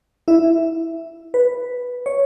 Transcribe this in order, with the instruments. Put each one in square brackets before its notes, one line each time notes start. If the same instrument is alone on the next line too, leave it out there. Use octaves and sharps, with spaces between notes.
[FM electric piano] E4 E5
B4
C#5